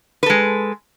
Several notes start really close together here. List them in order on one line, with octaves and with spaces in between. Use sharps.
B4 A4 G#3